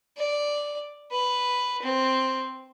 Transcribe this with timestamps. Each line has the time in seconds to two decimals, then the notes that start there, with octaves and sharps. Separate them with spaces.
0.17 D5
1.12 B4
1.82 C4